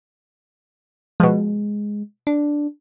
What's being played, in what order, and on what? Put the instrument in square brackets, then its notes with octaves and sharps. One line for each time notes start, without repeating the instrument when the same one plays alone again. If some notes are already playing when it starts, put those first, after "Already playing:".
[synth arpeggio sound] B2 F3 [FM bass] G#3
[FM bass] D4